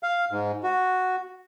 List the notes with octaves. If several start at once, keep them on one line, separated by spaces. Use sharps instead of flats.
F5
G#2
F#4